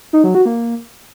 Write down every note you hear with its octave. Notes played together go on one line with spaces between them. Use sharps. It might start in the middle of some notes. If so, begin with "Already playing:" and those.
D#4
F#3
F#4
A#3